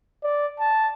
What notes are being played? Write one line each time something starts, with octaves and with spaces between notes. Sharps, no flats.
D5
A5